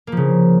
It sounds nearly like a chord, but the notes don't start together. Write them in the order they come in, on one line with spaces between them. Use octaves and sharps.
A#3 F3 C#3